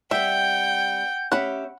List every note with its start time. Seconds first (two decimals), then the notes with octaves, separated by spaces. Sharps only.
0.11 G3 C4 E5 F#5 G5 G6
1.32 C#4 G4 E5 F#5 B5